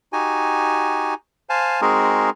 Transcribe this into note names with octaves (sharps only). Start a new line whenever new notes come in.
D#4 F#4 G4 G#5
C5 F5 G#5 A5
G#3 C4 D#4 F#4 G#4 A#4